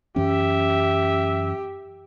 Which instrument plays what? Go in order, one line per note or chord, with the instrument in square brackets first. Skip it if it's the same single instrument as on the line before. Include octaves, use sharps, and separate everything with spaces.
[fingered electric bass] F#2 E3 C#4 [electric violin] G4 [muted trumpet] E5